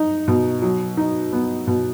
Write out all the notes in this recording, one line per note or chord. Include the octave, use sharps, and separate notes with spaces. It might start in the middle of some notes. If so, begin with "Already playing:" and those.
Already playing: D#4
B2
F#3
D#4
B3
B2